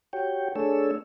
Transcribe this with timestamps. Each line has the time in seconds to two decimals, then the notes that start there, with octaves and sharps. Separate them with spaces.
0.13 F#4 G4 C#5 G5
0.55 A3 D4 G#4 A4 C#5 E6